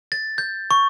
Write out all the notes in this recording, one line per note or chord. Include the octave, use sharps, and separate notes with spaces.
A6
G6
C#6